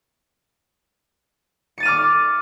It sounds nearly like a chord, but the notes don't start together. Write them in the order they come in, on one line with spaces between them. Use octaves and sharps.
C#7 A6 D#7 F6 D6